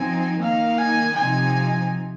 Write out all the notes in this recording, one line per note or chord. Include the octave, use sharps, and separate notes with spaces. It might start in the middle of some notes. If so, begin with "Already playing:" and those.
Already playing: F3 C4 D#4 G#5
D#3 A#3 D#4 F5
G#5
C3 F3 C4 D#4 G#5